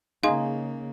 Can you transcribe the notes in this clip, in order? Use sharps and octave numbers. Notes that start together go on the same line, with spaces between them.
C#3 A#3 D#4 G#4 F5 C6